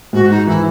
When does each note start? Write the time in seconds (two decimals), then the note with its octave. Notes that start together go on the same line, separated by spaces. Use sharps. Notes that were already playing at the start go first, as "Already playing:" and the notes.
0.13 G#2 F#4
0.30 D#4
0.47 E3 E4